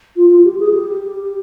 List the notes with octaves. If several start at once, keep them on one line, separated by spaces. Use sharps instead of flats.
F4
F4
G4
G#4
G4